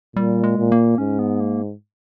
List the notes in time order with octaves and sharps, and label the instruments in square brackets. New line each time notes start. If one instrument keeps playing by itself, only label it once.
[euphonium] A#2 [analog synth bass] G3
[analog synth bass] G#3
[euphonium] A#2
[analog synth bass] A#3
[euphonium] G#2 [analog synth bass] C#4
[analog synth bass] B3
A#3